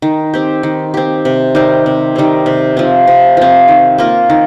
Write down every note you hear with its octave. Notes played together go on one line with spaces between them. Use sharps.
D#3
C4 G4
D#3
C4 G4
C3
D#3 G3 C4
C3
D#3 G3 C4
C3
F3 C4
C3
F3 C4
D#3
A#3 F4 A#4
D#3